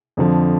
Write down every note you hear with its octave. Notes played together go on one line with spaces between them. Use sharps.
F2 D3 F3